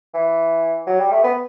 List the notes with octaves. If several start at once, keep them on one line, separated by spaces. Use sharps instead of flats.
E3
F#3
G3
A3
B3